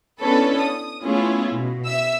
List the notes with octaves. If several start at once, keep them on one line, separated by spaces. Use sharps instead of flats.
B3 C#4 D4 E4 A4 B4
D#6
A3 B3 C#4 E4 F4 G#4
B2
E5 E6